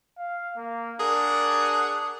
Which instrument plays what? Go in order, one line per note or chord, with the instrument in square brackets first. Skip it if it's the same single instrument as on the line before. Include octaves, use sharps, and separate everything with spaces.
[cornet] F5
A#3
[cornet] D4 [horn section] G#4 A#4 F#5